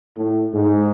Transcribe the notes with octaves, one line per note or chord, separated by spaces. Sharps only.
A2
G#2